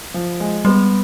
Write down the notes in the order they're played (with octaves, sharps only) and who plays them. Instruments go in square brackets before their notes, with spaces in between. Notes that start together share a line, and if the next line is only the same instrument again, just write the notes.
[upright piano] F3
G#3
[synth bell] G3 [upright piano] B3